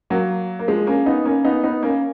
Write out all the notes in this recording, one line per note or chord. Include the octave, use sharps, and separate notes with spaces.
F#3 A#3
A#3
F3 G#3
A#3 C#4
B3 D#4
A#3 C#4
B3 D#4
B3 D#4
A#3 C#4